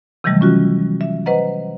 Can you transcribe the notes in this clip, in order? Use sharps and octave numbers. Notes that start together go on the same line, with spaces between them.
C3 D#3 E3 F#3 G3 A3
C#4 F4 F#4
E5
B4 C5 D#5 F#5 A#5